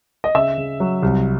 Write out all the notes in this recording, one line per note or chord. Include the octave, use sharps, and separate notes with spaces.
D#5
C#3 E5
C#3
F#3
C2